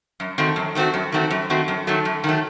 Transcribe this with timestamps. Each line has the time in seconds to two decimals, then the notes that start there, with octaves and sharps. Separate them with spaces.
0.20 F#2
0.38 D#3 A3 C4 F#4
0.56 F#2
0.75 D#3 A3 C4 F#4
0.94 F#2
1.12 D#3 A3 C4 F#4
1.31 F#2
1.50 D#3 A3 C4 F#4
1.68 F#2
1.87 D#3 F#3 A3
2.05 F#2
2.24 D#3 F#3 A3